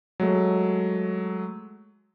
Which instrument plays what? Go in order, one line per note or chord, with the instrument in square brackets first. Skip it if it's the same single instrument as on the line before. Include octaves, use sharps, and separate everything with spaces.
[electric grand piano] F#3 G#3 A3